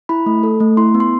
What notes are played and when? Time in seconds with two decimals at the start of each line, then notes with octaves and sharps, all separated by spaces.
0.09 E4 B5
0.26 A3
0.43 A4
0.60 A3
0.77 E4 C6
0.94 B3
1.00 C6